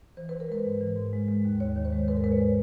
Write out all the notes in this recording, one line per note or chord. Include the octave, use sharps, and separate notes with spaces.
E3 C5
E3 B4
A#4
G#3 B4
G#2
E3
G#2
G#3
G#3
D#2
D#2 C#5
D#3
C5
G#3
G#2 B4
A#4
G#3 B4
C#5